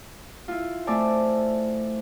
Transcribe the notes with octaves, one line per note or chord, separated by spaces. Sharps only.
E4 F4
A3 C4 D5 E5 G#5 A5